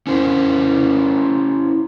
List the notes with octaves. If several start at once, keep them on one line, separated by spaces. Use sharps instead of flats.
C#4 E4 C5